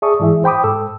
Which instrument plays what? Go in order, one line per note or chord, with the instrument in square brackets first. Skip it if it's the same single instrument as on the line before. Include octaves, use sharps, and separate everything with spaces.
[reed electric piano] G#4 D5 E5 A5 C#6 D#6
G#2 E3 E4 G#4 E5
C5 G5 B5 D6 D#6
G#2 A4 E6